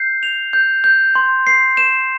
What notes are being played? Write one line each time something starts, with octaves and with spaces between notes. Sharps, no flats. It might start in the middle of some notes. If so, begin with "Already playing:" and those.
Already playing: G6 C7
F7
G6
G6
C6
C7
E7